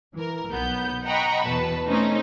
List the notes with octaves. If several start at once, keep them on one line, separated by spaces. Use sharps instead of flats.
E3 A#4
B1 B3 G6
D#5 F#5 G5 A#5 B5 C#6
E2 B2 B4 A5
A3 C4 C#4 D#4 C5